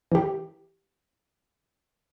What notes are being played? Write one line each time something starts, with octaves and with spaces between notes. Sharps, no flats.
E3 G4